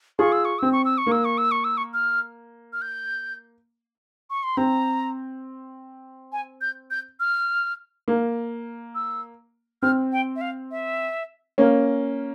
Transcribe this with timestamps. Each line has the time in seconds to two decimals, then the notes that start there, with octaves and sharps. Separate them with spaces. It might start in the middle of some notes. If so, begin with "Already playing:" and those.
0.19 F4 G#4 C#6
0.32 E6
0.45 C#6
0.59 C4 E6
0.72 C#6
0.85 E6
0.98 C#6
1.07 A#3
1.12 E6
1.25 C#6
1.38 E6
1.51 C#6
1.64 E6
1.77 C#6
1.94 F6
2.73 F6
2.82 G6
4.30 C#6
4.43 C6
4.57 C4 A#5
6.32 G#5
6.61 G6
6.91 G6
7.20 F6
8.08 A#3
8.95 E6
9.82 C4 F6
10.12 G5
10.36 E5
10.41 F5
10.71 E5
11.58 A#3 C#4